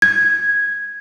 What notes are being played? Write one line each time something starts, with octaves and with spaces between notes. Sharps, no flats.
G#6